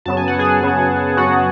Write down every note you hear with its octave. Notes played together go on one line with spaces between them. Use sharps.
F#2 C#3 F#3 B3 A5
G#5
F#5
G#4 G#5
F#2 C#3 F#3 B3
F#2 C#3 F#3 B3 F#4 F#5